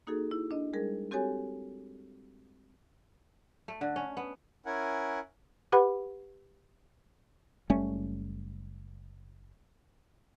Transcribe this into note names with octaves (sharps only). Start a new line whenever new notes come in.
A#3 D#4 F#4 G#4 A4
E4
D4 D#5
G3 G#3 G#4 A#4
C4 F#4 G4 A4 C#5 G#5
A3
D3
C#4
B3
C#4 E4 A#4 F#5 G#5
G4 B4 F#5 B5
F#1 G3 A3 C#4